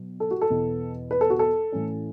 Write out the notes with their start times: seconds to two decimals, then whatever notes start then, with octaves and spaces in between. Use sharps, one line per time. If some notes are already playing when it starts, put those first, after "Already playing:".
Already playing: B2 F#3
0.20 A4
0.31 F#4
0.41 A4
0.50 E2 B2 B3
1.11 B4
1.21 A4
1.30 F#4
1.39 A4
1.72 A2 E3 A3 C#4